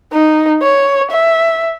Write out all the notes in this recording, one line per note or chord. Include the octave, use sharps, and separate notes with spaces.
D#4
C#5
E5